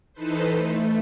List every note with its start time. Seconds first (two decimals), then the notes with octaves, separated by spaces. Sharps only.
0.13 E3 D#4 A4 B4 C5
0.55 A3